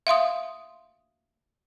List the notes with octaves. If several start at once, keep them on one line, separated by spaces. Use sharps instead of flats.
E5 F5 C6 D#6